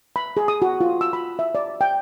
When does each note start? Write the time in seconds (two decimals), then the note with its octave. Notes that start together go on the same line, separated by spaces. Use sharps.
0.16 B5
0.37 G#4
0.48 D#6
0.62 F#4
0.81 F4
1.01 E6
1.13 B5
1.39 E5
1.55 D5
1.81 G5